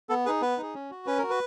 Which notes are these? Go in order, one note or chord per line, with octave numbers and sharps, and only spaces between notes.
B3 A4
D#4 G#4 B4
B3 B4
D#4 G#4
C#4
F#4
C#4 B4
F#4 A#4
B4